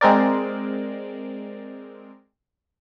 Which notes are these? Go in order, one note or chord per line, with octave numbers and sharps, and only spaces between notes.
G#3 C4 A#4 D5